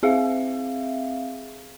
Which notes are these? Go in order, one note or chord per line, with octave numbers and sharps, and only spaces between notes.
C4 G#4 E5 F5